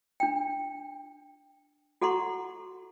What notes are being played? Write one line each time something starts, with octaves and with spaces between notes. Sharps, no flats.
D4 G5
F#4 A4 F#5 A#5 C6 C#6